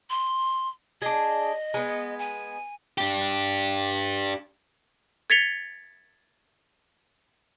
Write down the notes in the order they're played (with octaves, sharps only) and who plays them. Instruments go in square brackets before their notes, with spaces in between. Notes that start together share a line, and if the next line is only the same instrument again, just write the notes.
[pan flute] C6
[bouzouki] D4 G#4 [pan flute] D#5
[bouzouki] G#3 B3
[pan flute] G#5
[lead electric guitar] D4 G4
[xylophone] G#6 A6 B6 C#7 F7 G7